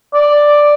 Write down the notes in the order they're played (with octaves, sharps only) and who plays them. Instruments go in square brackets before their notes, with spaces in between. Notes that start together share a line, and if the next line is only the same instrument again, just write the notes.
[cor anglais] D5